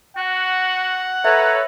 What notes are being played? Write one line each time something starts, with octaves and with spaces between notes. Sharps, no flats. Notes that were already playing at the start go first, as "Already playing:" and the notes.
F#4 F#5
A4 B4 C#5 E5 A#5